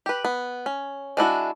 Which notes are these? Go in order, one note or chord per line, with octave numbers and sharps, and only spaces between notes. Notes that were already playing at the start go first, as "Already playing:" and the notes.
G4 B4
B3
C#4
G#3 D4 E4 F#4